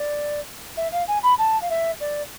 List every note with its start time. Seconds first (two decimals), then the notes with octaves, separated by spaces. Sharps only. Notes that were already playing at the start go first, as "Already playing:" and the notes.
Already playing: D5
0.77 E5
0.92 F5
1.08 G#5
1.23 B5
1.38 A5
1.62 F5
1.70 E5
2.00 D5